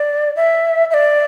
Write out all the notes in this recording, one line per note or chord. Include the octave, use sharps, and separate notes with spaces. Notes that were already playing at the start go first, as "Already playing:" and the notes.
Already playing: D5
E5
E5
D5